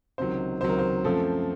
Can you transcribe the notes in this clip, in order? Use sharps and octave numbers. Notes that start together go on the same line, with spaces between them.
C#2 C3 D#3 F#3 C5
C#2 C3 D#3 F#3 C5
A#4
C5
F#2 F3 A3 C4 A4